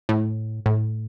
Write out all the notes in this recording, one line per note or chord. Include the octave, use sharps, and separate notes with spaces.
A2
A2